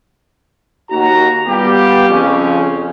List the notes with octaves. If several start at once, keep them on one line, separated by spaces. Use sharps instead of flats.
D#2 F#4 A#5
G3 B3 F4 G4
F2 C#3 C#4